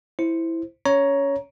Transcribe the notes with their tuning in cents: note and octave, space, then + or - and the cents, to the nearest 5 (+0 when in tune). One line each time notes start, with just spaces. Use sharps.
E4 +0 C5 +0
C#4 +20 C#5 +5 A#5 +10